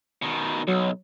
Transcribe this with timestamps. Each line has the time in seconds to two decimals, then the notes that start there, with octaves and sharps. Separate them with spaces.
0.22 B2 D#3
0.67 B1 F#3